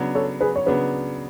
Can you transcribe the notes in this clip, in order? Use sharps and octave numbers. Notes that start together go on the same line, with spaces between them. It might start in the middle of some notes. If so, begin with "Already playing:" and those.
Already playing: C#3 F#3 B3 D4
A4 C#5
G#4 B4
C#5
C#3 F#3 B3 D4 G#4 B4